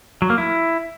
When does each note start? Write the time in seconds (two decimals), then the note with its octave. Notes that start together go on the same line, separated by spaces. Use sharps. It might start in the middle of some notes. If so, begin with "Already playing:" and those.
0.22 F#3
0.30 A#3
0.38 E4